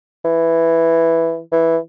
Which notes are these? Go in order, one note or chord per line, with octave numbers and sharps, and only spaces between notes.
E3
E3